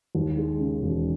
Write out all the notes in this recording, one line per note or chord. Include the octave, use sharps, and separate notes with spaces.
D#2
G#3
C#3
E1